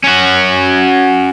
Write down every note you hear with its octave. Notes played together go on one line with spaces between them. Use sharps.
C#4 F#4